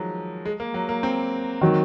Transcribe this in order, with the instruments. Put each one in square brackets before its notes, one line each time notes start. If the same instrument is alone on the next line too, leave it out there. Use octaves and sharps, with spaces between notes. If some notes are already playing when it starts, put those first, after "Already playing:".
Already playing: [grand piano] D#3 F3 F#3 G#3
G#3
A#3
F#3
A#3
C4
[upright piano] D#3 F#3